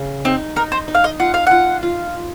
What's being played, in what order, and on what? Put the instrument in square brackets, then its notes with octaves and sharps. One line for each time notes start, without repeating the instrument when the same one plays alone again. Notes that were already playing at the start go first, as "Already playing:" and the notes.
Already playing: [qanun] C#3
[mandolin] C4 [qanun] D#4
[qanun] D#4 [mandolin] A#4
[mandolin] C5
[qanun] D#4
[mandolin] F5
D#5
[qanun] F4 [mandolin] F#5
[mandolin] F5
[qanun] F4 [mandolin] F#5
[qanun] F4